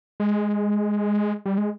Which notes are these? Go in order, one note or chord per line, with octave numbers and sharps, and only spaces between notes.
G#3
G3
G#3